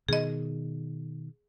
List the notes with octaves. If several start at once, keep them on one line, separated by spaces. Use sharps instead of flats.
B2 D#3 G#4 D#5